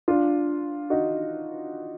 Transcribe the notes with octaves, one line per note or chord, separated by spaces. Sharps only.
D4 F4
D#4 F#4